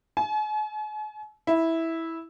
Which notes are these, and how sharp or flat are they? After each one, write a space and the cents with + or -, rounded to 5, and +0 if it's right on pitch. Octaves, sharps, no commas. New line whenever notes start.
G#5 +45
E4 -10